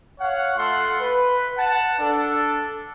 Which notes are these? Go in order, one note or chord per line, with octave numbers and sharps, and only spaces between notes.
C#5 F5 F#5
A3 F4 A4 F#5 C6
B4
F#5 A5
D4 A4